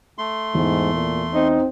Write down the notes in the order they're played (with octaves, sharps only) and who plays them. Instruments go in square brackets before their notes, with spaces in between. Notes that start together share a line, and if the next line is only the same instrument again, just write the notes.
[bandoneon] A3 C6
[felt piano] E2 [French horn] G#2
[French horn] A#2
[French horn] C4 [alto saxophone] D#4